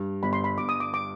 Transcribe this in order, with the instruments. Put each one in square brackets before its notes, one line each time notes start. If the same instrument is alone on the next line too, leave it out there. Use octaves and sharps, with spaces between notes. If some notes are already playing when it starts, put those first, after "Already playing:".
Already playing: [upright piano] G2
[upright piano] G1 [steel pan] B5
[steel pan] C6
B5
[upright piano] G1 [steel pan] D6
[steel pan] D#6
D6
D6